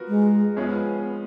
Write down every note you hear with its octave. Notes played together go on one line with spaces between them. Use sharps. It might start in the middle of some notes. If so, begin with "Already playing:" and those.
Already playing: F3 B3 F#4 A#4
G#3
F3 G#3 B3 C#4 G#4